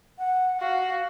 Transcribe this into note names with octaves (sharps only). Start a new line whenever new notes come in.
F#5
F#4 F5